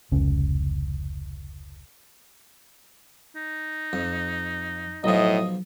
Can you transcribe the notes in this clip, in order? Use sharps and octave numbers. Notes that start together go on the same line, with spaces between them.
F1 C#2 C#4
D#4
F2
B1 A2 F3 D#5